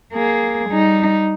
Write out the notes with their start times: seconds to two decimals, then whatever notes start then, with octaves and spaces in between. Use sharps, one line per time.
0.13 A#3 G#4
0.70 G3 D#4